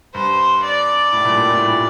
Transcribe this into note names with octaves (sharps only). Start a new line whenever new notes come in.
G2 C5
D5
A2
G2 A#2
A2
A2
G2 A#2